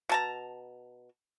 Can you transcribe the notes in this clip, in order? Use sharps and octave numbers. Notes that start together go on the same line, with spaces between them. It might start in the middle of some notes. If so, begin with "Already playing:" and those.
B2 A5 A#5